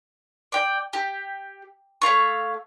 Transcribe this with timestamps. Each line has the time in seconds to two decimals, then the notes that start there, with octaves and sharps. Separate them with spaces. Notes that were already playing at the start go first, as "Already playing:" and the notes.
0.52 D5 G5
0.93 G4
2.02 A3 C#5 F5 C#6